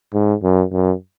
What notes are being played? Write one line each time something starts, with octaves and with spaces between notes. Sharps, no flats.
G#2
F#2
F#2